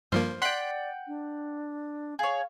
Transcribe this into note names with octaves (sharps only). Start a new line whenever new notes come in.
G2 F3 A#3 C5 F6
D5 F#5 G5 C6 F#6 B6
D4
G#4 C#5 F5